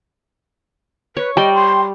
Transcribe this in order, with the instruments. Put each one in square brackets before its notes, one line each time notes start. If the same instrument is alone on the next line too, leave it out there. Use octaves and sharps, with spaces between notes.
[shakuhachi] B4 [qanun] C#5
[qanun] G3 [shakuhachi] D#5 [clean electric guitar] G5
[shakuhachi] C6